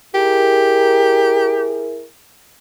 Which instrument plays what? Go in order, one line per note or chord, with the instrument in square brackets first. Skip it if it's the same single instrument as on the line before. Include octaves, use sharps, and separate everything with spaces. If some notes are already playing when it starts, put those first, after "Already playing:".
[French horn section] E4 G#4 A#4 [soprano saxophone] G4